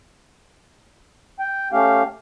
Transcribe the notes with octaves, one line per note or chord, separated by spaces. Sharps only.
G5
A3 C#4 G4 F5